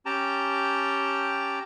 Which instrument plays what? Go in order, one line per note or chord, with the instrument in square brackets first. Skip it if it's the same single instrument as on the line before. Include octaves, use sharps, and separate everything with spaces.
[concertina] C#4 G4 G5 A5 A#5